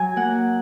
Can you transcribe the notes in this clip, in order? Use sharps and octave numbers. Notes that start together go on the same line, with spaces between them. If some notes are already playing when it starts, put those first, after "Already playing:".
Already playing: F#3 G#5
A#3 F#5